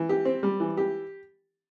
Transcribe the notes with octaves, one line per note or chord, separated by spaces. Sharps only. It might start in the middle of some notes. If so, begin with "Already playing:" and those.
Already playing: E3
G4
C4
G3
E3
G4